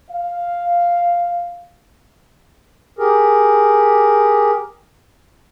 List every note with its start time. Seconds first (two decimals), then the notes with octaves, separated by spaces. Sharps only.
0.10 F5
2.99 G4 G#4 A#4